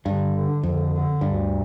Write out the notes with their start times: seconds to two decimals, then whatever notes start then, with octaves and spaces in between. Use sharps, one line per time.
0.05 G2 D3
0.34 D3
0.63 F2 D3
0.92 D3
1.21 D2 G2
1.49 C3